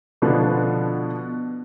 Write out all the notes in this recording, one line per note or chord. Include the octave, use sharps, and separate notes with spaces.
B2 D3 F3 B3 D4